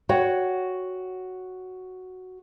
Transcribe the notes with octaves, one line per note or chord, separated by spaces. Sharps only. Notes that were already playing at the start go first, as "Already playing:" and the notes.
F#4 C#5 F#5 G5